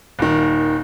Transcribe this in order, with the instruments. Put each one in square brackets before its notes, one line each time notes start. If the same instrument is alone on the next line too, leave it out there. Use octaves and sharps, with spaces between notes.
[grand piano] D#1 D#3